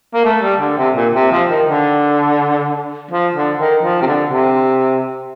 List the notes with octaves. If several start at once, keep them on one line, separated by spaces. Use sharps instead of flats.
A#3
A3
G3
D3
C3
A#2
C3
F3
D#3
D3
F3
D3
D#3
F3
C3
D3
C3